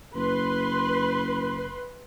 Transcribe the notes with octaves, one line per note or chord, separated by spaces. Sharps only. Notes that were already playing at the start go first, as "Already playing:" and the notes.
F#1 B4 C6